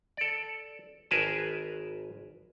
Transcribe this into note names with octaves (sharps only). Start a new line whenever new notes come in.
A4 D5
G#1 G#4 A#4 B4 G#5 A5